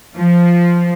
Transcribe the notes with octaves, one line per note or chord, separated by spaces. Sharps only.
F3